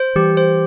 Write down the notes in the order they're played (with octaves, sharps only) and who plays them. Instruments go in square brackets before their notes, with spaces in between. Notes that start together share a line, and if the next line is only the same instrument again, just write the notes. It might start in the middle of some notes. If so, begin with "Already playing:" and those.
Already playing: [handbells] C5
[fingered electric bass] E3 G3 [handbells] G4
[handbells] C5